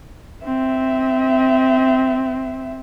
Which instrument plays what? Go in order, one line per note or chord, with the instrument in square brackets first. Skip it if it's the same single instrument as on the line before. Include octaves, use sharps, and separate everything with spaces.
[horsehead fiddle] C4 E5